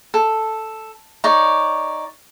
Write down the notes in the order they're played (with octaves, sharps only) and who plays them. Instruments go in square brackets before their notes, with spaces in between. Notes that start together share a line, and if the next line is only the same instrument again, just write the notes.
[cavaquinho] A4
D#4 C#5 D5